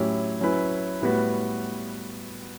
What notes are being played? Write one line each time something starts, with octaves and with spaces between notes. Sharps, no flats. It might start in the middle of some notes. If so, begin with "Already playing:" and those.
Already playing: A2 F#3 C#4 E4 G4
F#3 C#4 E4 B4
A2 G3 B3 F#4 B4